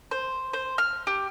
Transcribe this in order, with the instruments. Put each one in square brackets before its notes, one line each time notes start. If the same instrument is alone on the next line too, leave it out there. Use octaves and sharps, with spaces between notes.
[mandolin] C5
C5
F6
G4